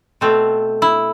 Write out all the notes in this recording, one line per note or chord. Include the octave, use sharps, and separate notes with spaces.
B2 A3 C4
E4